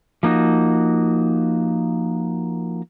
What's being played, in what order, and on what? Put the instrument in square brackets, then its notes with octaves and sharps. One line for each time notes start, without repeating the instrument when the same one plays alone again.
[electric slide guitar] F3 A#3 D#4 F#4